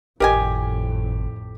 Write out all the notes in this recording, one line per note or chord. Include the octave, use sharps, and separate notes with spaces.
G#1 F2 A2 G4 A#4 D#5 G#5